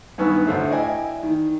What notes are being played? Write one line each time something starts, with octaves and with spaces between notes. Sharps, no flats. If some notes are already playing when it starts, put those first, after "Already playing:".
G2 D#3 B3 G#5 C#6 E6
D2 A2 A4 C5 E5
E4 D5 D#5 G5 G#5
D#3